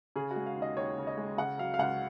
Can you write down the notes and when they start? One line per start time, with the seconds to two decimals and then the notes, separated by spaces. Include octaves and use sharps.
0.16 C#3 G#4
0.31 F#4
0.36 G#3
0.46 F5
0.56 D#2
0.62 D#5
0.77 D#2 C#5
0.98 C#3
1.07 D#5
1.17 G#3
1.38 C#3 F#5
1.58 F#3 F5
1.74 F5
1.79 C#2 F#5